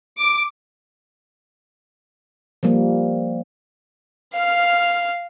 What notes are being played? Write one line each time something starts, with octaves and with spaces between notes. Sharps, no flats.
D6
F3 G3 A#3
F5 F6